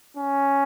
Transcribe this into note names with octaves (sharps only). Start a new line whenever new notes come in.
C#4